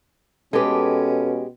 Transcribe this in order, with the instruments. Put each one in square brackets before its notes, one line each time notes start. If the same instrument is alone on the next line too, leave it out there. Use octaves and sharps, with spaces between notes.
[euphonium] B2 [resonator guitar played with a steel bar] G#3 G4 [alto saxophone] C#4 [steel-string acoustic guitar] A4 B4